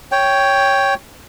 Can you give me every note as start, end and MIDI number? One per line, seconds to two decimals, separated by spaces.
0.12 0.94 73
0.12 0.94 79